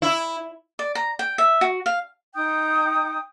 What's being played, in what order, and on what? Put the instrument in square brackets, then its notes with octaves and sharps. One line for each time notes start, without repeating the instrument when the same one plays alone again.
[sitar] E4
[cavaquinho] D5
A#5
G5
E5
F#4
F5
[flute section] D#4 G5 D#6 G6